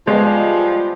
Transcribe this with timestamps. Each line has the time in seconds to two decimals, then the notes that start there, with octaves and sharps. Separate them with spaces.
0.07 F3 G3 G#3 B3 F4